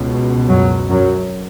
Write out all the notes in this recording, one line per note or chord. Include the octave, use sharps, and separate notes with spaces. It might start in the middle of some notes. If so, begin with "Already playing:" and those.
Already playing: C#2 B2
F#2 F#3
F#2 F#3